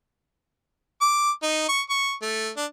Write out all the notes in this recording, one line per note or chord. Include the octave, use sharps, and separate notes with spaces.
D6
D#4
C#6
C#6
A3
D4